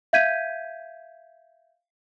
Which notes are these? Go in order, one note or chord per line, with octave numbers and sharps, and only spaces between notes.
E5 F5 G6 G#6 B6 D#7